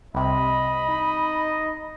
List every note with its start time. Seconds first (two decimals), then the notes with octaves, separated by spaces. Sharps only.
0.15 C2 C3 D#5 B5
0.88 D#4